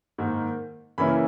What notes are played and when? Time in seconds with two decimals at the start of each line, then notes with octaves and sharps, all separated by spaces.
0.18 G#2 D#3 A#3
0.98 C#3 E3 A#3 C#4 E4 B5